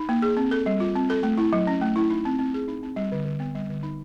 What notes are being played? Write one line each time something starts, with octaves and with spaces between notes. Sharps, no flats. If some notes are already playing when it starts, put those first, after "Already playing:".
Already playing: D#4
A#3
G#4
C4
A4
G3
F4
C4
A4
A3
E4
F#3
C#4
A3
E4
D#4
C4
C4
G#4
D#4
C4
G3
D3
D3
B3
G3
D3
D#4